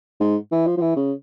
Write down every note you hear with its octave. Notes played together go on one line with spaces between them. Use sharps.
G#2
E3
F3
F3
E3
C#3